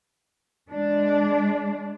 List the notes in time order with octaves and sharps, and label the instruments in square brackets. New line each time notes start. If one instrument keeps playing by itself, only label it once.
[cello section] G#3 D4